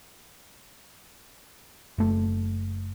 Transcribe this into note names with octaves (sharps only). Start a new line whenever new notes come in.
F#1 A3